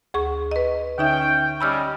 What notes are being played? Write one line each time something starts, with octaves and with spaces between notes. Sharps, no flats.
D2 G#4 C#6
B4 D#5
D3 C#4 D#4 E5 G5
G3 C#4 D#5 B5 E6 F6